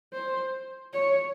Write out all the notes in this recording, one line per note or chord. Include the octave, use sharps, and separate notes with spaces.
C5
C#5